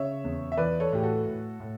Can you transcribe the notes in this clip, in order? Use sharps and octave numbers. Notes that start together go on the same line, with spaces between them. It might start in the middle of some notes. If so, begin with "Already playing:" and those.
Already playing: C#3 C#5 E5
E2
E5
E3 B4 D5
A4 C#5
A2 G4
F#4 A4
A2
A2